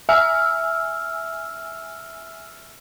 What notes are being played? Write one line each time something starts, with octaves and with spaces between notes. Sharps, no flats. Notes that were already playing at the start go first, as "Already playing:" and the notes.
E5 G#5 E6 F6